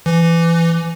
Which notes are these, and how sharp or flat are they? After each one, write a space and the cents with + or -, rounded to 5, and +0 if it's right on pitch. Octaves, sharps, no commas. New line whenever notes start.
E3 +25